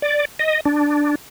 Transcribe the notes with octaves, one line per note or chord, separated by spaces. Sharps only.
D5
D#5
D4